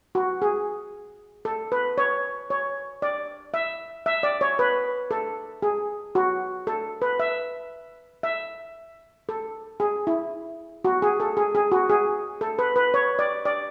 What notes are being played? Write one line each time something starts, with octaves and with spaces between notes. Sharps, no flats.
F#4
G#4
A4
B4
C#5
C#5
D5
E5
E5
D5
C#5
B4
A4
G#4
F#4
A4
B4
E5
E5
A4
G#4
E4
F#4
G#4
A4
G#4
G#4
F#4
G#4
A4
B4
B4
C#5
D5
D5